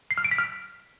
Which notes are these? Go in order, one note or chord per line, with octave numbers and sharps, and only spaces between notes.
C7
F6
D7
B6
F6